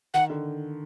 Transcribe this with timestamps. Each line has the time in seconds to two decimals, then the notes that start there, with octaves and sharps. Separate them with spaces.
0.14 D#3 F#5
0.30 D3